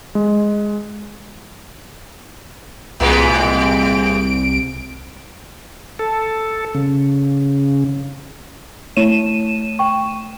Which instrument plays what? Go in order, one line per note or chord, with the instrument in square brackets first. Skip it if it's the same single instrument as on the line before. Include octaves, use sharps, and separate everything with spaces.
[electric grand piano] G#3
[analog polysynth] C2 D7 [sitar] A2 G#3 B3
[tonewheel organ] A4
C#3
[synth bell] A3 D#7 E7 [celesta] E4 C#5
[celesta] G5 C#6